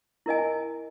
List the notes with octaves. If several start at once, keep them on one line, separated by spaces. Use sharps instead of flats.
E4 A#4 D#5 G#5